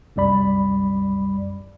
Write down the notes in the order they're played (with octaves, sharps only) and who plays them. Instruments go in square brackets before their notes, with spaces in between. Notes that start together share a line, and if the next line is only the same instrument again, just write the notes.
[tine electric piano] C2 F#2 G3 D5 B5